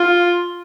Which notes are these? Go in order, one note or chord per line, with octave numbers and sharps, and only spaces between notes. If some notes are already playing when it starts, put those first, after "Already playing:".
Already playing: F4